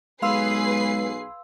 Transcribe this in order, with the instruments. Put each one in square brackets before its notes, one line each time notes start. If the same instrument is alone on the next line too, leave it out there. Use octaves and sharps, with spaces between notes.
[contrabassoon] B1 [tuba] G#3 [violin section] G#4 B4 C7 [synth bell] F5 C6 E6